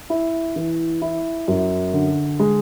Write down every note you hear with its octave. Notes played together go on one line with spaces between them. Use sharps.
E4
E3
E4
F#2
D3
G#3